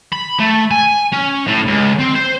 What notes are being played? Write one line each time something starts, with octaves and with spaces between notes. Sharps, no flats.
B5
A3
G#5
C#4
A2
C#2
C4
C5